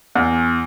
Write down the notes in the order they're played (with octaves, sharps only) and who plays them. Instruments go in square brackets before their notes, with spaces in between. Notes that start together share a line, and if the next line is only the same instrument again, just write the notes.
[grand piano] E2